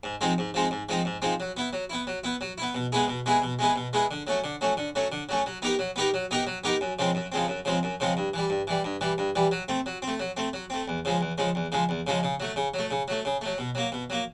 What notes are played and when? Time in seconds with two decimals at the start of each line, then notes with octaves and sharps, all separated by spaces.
0.04 G#2
0.21 F3 G#3 C4 D#4
0.38 G#2
0.54 F3 G#3 C4 D#4
0.71 G#2
0.89 F3 G#3 C4 D#4
1.05 G#2
1.22 F3 G#3 C4 D#4
1.40 F#3
1.57 B3 E4
1.73 F#3
1.90 B3 E4
2.07 F#3
2.24 B3 E4
2.41 F#3
2.58 B3 E4
2.75 B2
2.92 G#3 B3 E4 G#4
3.08 B2
3.26 G#3 B3 E4 G#4
3.42 B2
3.59 G#3 B3 E4 G#4
3.76 B2
3.93 G#3 B3 E4 G#4
4.11 D3
4.27 F#3 A3 C#4
4.44 D3
4.61 F#3 A3 C#4
4.77 D3
4.95 F#3 A3 C#4
5.12 D3
5.29 F#3 A3 C#4
5.46 F#3
5.62 B3 D#4 G4 A#4
5.79 F#3
5.96 B3 D#4 G4 A#4
6.14 F#3
6.31 B3 D#4 G4 A#4
6.47 F#3
6.64 B3 D#4 G4 A#4
6.81 F#2
6.99 C#3 F3 G#3 C4
7.15 F#2
7.32 C#3 F3 G#3 C4
7.48 F#2
7.65 C#3 F3 G#3 C4
7.83 F#2
8.00 C#3 F3 G#3 C4
8.17 G2
8.34 E3 G3
8.50 G2
8.67 E3 G3
8.84 G2
9.01 E3 G3
9.18 G2
9.35 E3 G3
9.51 F#3
9.68 A3 C4
9.86 F#3
10.02 C4
10.08 A3
10.20 F#3
10.37 A3 C4
10.53 F#3
10.70 A3 C4
10.88 E2
11.05 C#3 F3 G#3
11.21 E2
11.38 C#3 F3 G#3
11.55 E2
11.72 C#3 F3 G#3
11.89 E2
12.07 C#3 F3 G#3
12.23 C#3
12.40 F#3 A3
12.56 C#3
12.74 F#3 A3
12.91 C#3
13.08 F#3 A3
13.25 C#3
13.41 F#3 A3
13.58 B2
13.75 F#3 A#3
13.92 B2
14.10 F#3 A#3